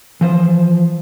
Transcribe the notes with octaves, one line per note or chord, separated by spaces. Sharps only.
E3 F3 C5